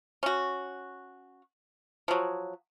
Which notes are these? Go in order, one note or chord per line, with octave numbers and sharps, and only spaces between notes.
C#4 F#4
F3 F#3